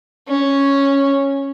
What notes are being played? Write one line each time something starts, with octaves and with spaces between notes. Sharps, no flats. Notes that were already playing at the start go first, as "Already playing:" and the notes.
C#4